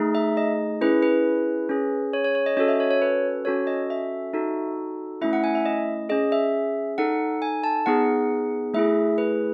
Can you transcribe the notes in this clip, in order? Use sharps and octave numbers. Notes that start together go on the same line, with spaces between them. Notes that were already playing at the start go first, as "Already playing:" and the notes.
Already playing: A3 D#4 G#4
E5
D#5
C#4 E4 G#4 B4
B4
C#4 G#4
C#5
C#5
C#5
D#5
C#4 F#4 A4 D#5
E5
C#5
C#5
B4
C#4 F#4 A4 C#5
D#5
E5
D#4 F#4 A4
A3 C#4 E4 E5
F#5
G#5
E5
D#5
C#4 G#4 D#5
E5
D#4 A4 F#5
G#5
A5
B3 D#4 G#4 F#5
A3 E4 G#4 E5
B4